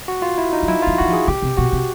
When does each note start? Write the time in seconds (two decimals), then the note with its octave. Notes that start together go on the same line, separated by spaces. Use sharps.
0.08 F#4
0.22 F4
0.38 E4
0.53 D#4
0.63 G3
0.68 F#3 E4
0.82 F#3 F4
0.98 F#3 F#4
1.08 F3
1.13 G#4
1.28 C#3 G4
1.42 C3
1.57 B2 F#4
1.73 C3